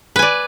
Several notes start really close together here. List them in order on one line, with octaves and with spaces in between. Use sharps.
B4 G#5 D5